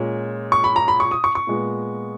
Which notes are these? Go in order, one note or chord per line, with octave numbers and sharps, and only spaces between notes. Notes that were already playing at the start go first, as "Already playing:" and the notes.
Already playing: A#2 G#3 C#4
C#6
B5
A#5
B5
C#6
D#6
C#6
C#6
A#2 G#3 B3